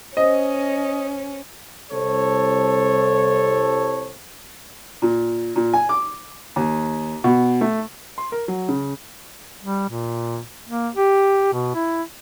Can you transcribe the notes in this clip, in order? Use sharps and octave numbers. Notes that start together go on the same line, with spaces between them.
C#4 C5 D#5
C2 A4 C5 C#5
A#2
A#2
G#5
D6
D#2
B2
A3
C6
A#4
F#3
C#3
G3
A#2
A#3
G4
B2
E4